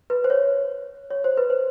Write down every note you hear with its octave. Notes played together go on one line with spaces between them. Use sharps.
B4
C5
C#5
C#5
C5
B4
C5